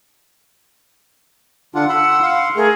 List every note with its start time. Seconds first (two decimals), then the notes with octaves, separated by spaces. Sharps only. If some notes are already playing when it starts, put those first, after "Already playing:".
1.75 D3 D4 F4 F#5
1.89 B5 C6 E6
2.22 F5 C6
2.56 A3 G#4 A#4